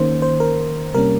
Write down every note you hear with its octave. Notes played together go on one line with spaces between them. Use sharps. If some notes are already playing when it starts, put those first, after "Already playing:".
Already playing: D#3 A#3 C#4 C5
C5
A#4
C3 G3 A#3 C#4 A#4